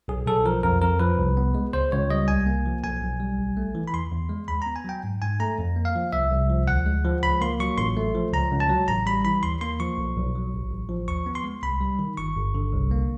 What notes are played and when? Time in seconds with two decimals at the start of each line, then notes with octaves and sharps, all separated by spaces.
0.08 B1 G#4
0.27 B1 A4
0.45 F3 A#4
0.63 F2 A#4
0.82 F2 A#4
1.00 F3 B4
1.18 C2
1.37 B3
1.55 G#3
1.73 C#2 C5
1.92 C#2 C#5
2.10 G3 D#5
2.28 C2 G#5
2.46 A#3
2.66 F3
2.84 B1 G#5
3.02 B1
3.20 G3
3.38 A1
3.57 A3
3.75 E3
3.88 B5
3.93 E2 C6
4.12 E2
4.29 G#3
4.48 D#2 B5
4.62 B3 A#5
4.76 G#5
4.84 F#3 G5
5.04 G#2
5.22 G#2 G#5
5.40 A3 A#5
5.59 F2
5.76 A#3
5.85 F5
5.95 F3
6.13 C2 E5
6.32 C2
6.50 F3
6.67 D2 F#5
6.86 G#3
7.04 F3
7.23 C#2 B5
7.41 A#3 C6
7.60 F#3 C#6
7.78 A1 C6
7.97 A3
8.15 F3
8.33 C#2 A#5
8.51 C#2
8.60 A5
8.69 F#3
8.88 A1 A#5
9.06 G3 B5
9.25 E3 B5
9.43 D#2 C6
9.61 A#3 C6
9.80 F3 C#6
9.98 B1
10.16 B1
10.35 F#3
10.53 A1
10.71 A1
10.89 F3
11.08 D#2 C#6
11.26 B3
11.35 C6
11.44 G#3
11.63 C2 B5
11.81 G3
11.99 D#3
12.17 G1 C#6
12.36 G1
12.55 D3
12.73 C2
12.91 A#3